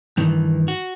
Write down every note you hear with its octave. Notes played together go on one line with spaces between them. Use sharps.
G2 D#3 E3
F#4